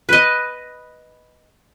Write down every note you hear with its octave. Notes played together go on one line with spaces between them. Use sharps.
B4 D#5